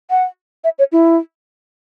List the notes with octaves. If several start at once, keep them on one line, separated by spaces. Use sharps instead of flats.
F#5
E5
C#5
E4